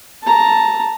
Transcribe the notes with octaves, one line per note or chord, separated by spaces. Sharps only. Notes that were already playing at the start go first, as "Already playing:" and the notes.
A5 A#5